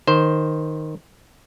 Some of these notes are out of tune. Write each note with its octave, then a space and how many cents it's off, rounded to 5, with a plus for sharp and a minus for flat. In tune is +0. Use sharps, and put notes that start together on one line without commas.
D#3 +0 C5 +0